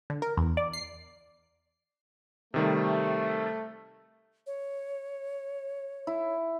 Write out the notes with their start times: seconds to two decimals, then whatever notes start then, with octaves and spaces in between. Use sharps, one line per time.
0.10 D3
0.22 A#4
0.37 E2
0.57 D5
0.73 C7
2.54 C3 D#3 G3 A3
4.47 C#5
6.07 E4